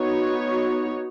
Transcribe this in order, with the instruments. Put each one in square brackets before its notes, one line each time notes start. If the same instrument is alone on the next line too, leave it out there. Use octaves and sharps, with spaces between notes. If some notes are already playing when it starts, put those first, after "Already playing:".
Already playing: [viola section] B3 D#4 F#4 C#5